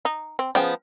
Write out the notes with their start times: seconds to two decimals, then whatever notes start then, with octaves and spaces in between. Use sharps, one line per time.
0.05 D#4
0.39 C4
0.55 C#3 F3 B3 G5